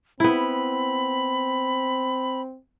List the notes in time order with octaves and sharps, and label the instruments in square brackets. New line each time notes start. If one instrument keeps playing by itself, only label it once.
[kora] B3 E4 [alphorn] C4 [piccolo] B5